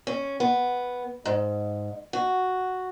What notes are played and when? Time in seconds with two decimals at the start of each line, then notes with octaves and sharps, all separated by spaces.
0.07 C#4
0.40 B3
1.25 G#2
2.13 F#4